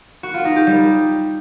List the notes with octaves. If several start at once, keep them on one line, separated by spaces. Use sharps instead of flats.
F#4
F4
D#4
G4
G3